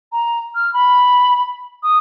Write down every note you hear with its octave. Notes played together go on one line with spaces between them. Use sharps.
A#5
F6
B5
D#6